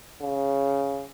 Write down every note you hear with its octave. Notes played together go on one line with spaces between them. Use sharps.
C#3